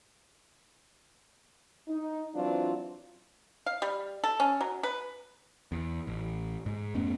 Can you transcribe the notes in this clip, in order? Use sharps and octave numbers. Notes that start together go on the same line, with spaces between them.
D#4
E3 F#3 C4 D4 F4
F5
G3
A4
C#4
F#3
B4
E2
A1
G#2
F2 A3 B3 C#4